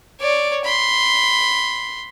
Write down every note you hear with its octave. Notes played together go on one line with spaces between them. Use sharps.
C#5 D5
B5 C6